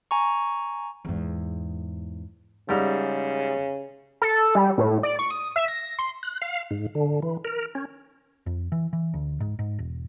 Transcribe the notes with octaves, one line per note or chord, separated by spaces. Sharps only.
G#5 A#5 C#6
E2 G#2
G#2 C#3 G3
A4
G3
A2
D5
C#6
D#6
E5
A#6
C6
F#6
F5
G#2
D3
E3
A#4
C#4
F2
E3
E3
D2
G#2
G#2
E1